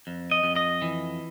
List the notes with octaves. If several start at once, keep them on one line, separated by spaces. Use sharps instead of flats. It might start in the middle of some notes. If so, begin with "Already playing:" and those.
F2
D#5
F2
D#5
E3